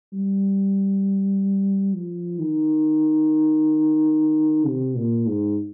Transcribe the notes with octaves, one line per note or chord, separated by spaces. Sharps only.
G3
F3
D#3
C3
A#2
G#2